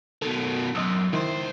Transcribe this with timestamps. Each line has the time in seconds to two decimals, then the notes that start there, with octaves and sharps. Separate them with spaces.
0.22 B2 D#3 A4
0.75 B1 F#2 D#5 D#6 E6
1.13 C#2 D#3 E4 C5